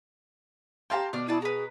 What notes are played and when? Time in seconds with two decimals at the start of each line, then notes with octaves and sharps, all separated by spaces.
0.90 G4 F5 G5 A5 A#5 C6
1.13 B2 D4 F6
1.28 E4 G#4 D5 A5
1.42 G#4 B4 A#5